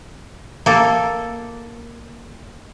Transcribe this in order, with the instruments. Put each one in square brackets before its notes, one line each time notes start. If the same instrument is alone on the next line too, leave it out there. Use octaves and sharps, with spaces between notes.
[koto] A#3 A4